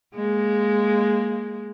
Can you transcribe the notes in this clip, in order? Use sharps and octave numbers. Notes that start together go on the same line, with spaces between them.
G#3 A#3